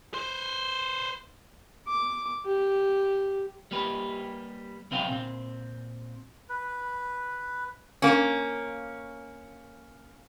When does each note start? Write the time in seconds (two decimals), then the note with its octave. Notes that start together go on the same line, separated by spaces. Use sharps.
0.14 B4 C5
1.87 D6
2.46 G4
3.71 G3 A#3 G4 B4
4.91 B1 C3 C4 B4 F5 G5
5.09 A#2 C4
6.49 B4
8.02 A#3 C#4